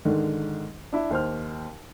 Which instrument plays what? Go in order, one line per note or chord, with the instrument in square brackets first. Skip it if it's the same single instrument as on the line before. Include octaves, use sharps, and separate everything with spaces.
[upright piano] G#2 D3 D#3
D4 E4
D#2 C5 F6